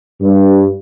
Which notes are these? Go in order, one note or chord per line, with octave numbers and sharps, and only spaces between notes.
G2